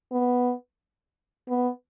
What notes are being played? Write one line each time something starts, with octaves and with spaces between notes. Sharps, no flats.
B3
B3